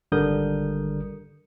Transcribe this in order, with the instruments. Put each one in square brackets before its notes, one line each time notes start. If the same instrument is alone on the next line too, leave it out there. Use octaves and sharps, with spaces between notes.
[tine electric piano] G#1 D3 G3 A#4 D#6 G6